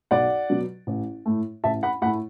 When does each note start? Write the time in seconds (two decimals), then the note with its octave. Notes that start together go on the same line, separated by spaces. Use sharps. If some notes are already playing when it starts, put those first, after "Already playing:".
0.11 B1 D5 F#5
0.50 B2 F#3
0.87 A1
1.26 A2 A3
1.64 A1 E5 A5
1.83 F#5 B5
2.02 A2 F#5 B5
2.06 A3